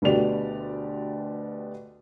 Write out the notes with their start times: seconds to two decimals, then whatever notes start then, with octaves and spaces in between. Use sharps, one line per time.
0.02 D2 B2 D3 G4 D5 F7